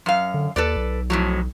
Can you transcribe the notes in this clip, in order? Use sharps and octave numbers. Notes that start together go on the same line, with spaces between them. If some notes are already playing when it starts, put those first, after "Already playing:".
F#2 F5
D3
D#2 A4 B4 D5
B1
F2 A2 F#3